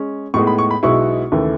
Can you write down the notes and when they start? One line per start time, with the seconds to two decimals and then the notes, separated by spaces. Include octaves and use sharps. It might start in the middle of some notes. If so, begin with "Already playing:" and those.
Already playing: G#3 C#4
0.34 A2 G#3 B3 D#4 C#6
0.47 B5
0.59 C#6
0.71 B5
0.83 B1 B2 G#3 B3 E4 C#6
1.32 D#2 C#3 E3 A3